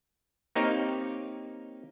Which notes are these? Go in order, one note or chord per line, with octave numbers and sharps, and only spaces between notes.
A#3 C4 D#4 G4 C#5 F5